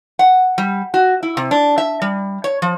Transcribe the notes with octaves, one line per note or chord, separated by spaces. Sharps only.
F#5
G3
F#4
E4
C3
D4
E5
G3
C#5
F3